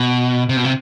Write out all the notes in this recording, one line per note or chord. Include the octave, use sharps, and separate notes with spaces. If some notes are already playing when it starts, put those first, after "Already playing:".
Already playing: B2
C3
B2
C3